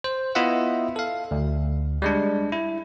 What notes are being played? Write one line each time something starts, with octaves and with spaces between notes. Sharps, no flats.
C5
B3 E4 F4 D#5 E5 F#5
A4 F5
D2
G3 G#3 D4
E4